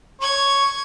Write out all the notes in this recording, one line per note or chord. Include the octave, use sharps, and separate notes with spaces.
C#5 C#6 G#6